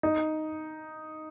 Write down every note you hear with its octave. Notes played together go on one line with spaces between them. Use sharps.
D#4